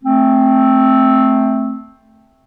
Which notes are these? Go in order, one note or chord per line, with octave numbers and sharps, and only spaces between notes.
A3 C4